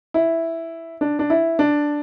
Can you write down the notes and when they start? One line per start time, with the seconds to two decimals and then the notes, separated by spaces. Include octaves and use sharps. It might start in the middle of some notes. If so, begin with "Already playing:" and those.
0.14 E4
1.01 D4
1.19 D4
1.30 E4
1.59 D4